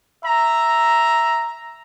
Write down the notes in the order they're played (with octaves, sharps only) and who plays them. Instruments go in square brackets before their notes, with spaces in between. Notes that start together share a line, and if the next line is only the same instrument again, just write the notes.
[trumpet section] E5 A#5